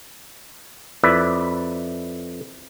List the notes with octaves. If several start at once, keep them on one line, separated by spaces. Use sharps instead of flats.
F2 E4 B4 D5 E5